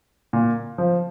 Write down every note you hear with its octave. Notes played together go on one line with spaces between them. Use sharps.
A#2
F3